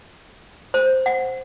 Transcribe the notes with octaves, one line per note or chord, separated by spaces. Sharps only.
C5
F#5